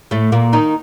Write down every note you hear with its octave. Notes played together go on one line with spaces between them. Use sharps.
A2 A3
A#2 A#3
D#3 D#4